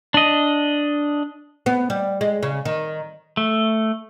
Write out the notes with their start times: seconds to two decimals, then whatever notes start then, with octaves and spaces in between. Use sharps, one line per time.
0.14 D4 D#5
1.66 B3
1.90 G3
2.21 G#3
2.43 C#3
2.65 D#3
3.37 A3